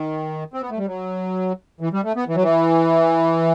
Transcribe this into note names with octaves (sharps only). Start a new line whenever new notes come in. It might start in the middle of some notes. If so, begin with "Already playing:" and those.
Already playing: D#3
C4
B3
A3
G3
F#3
E3
G3
A3
B3
E3
F#3
E3